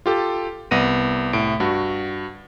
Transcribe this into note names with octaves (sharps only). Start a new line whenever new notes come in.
F4 G4 A4
C2 B3 A#6 D#7
C2 A2 D7
G2 F#4